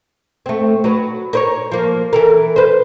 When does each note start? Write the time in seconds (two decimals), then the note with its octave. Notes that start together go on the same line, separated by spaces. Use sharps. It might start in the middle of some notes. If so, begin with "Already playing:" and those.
0.46 A3 C4
0.84 F#3 B4
1.33 A#4 C5 C#5
1.72 F3 A#3
2.13 E3 A4 A#4
2.56 B4 C5